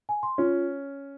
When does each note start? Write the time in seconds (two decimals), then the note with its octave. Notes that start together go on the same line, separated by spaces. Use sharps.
0.09 G#5
0.23 C6
0.38 C#4 F4